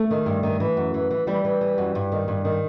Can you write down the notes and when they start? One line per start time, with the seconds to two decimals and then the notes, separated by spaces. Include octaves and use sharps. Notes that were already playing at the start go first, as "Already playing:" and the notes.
Already playing: A3
0.10 D#3
0.26 G2
0.43 D#3
0.60 E3
0.77 F#2
0.94 E3
1.10 E3
1.27 E3 G3
1.45 E3
1.61 E3
1.78 F#2
1.95 G2
2.12 D#3
2.28 G2
2.45 D#3